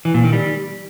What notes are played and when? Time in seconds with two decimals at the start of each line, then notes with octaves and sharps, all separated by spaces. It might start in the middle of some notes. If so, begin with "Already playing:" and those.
0.05 E3
0.14 A#2
0.24 D#3
0.33 G3